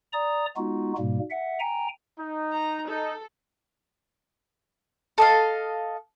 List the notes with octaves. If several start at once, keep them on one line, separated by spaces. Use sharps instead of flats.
D5 A#5 D#6
G#3 B3 D#4 F4 F#4
G#2 B2 G3 A#3
E5 F#5
G5 G#5 A#5
D#4
A#5
D#4 A4
A4 D#5 F5